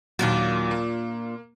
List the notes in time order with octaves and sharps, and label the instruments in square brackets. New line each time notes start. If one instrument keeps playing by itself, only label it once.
[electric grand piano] D#2 F#3 [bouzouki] A#2 D4 F4
[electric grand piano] A#3